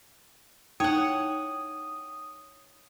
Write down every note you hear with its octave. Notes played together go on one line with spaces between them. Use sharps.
D#4 E4 C#5 F#5 G5 D#6